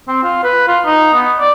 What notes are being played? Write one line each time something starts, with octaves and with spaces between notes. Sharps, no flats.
C4
F4
B4
F4
D#4
B3
D5